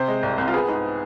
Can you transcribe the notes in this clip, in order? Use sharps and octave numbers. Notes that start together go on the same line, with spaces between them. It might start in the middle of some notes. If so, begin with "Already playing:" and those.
Already playing: C3 C5
G#3
C2
C2
F4
B3 G#4
G#2